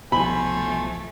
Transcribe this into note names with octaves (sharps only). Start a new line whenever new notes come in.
C2 B2 F3 A3 C5 G#5 B5